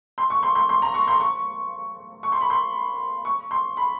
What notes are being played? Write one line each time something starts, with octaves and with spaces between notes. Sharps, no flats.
C6
C#6
C6
C6
C6
A#5
C#6
C6
C#6
C#6
C6
B5
C6
C#6
C6
B5